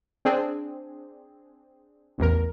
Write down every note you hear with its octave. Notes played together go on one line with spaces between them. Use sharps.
C4 D4 G#4
A1 E2 A#4